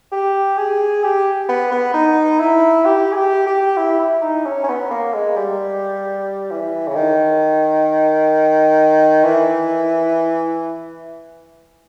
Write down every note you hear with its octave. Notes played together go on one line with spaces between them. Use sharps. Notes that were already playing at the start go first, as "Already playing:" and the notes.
G4
G#4
G4
B3
B3
D#4
E4
G4
G#4
G4
G4
E4
E4
D#4
C#4
C#4
B3
A#3
G#3
G3
E3
C#3
D#3
E3